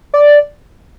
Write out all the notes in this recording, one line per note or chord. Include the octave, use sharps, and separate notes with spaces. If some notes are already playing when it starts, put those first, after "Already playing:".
D5